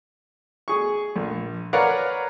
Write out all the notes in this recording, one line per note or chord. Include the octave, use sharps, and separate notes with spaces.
G#4 C#6
A#1
A#4 B4 C#5 D5 F5 F#5